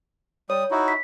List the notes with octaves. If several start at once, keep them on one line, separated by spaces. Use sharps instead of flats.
G3 C#5 D#6
D#4 E4 F#4
B6